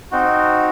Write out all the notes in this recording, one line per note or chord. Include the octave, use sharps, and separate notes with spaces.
C4 D#4 F#4